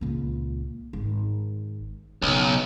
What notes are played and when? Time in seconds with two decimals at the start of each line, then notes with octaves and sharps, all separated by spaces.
0.01 C#2 A#2
0.93 G#1
2.22 B1 C#3